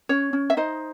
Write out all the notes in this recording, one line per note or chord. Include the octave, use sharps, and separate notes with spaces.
C#4 C#5
C#4
E5
D#4 C5 D#5